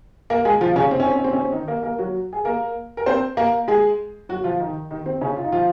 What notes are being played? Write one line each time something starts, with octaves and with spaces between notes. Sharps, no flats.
A#3 A#4
G#3 G#4
F3 F4
C#3 C#4
C4
C#4
C4
C#4
C4
C#4
C4
D#3 D#4
A#3 A#4
A#3 A#4
F#3 F#4
G#4
A#3 A#4
A#4
C4 C5
A#3 A#4
G#3 G#4
F#3 F#4
F3 F4
D#3 D#4
D#3 D#4
C4
C#3 C#4
F4
D#4
F3 F4